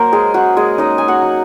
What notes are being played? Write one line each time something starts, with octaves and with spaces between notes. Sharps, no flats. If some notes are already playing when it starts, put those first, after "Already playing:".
Already playing: F#3 A#3 A#4 C5
G#3 G#4
C#4 F#4
G#3 G#4
C#4 D#4 D#5
G#5
F#4 F#5
F#3